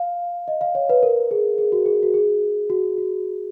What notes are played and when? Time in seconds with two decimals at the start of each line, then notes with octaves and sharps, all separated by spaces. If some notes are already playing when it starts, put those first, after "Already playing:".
Already playing: F5
0.48 D#5
0.61 F5
0.75 C#5
0.89 B4
1.03 A#4
1.31 G#4
1.58 G#4
1.72 F#4
1.86 G#4
2.03 F#4
2.14 G#4
2.70 F#4
2.98 F#4